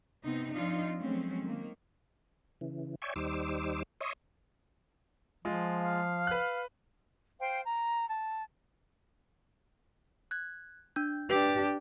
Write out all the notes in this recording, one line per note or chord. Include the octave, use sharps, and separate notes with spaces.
C3 B3 C4 D#4
F3 C4 D4 D#4 F4
F3 F#3 G#3 A3 C4 C#4
D#3 A#3
C#3 E3
C#5 D5 E5 G5 G#5 C#6
D#2 G3 D#4 C5 D6 E6
C#5 D#5 E5 C6 C#6 D#6
F3 G#3 F4
F5
B4 F#6
C5 F5 G5
A#5
A5
F#6 G#6
D4 G6
D4 G4 B4